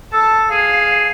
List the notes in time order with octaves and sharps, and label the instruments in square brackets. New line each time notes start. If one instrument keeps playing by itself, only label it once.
[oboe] A4 [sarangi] A5
[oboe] G#4 [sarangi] F5